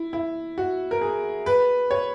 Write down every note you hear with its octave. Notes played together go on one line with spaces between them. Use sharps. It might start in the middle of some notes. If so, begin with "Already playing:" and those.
Already playing: E4
E4
F#4
A#4
G#4
B4
C#5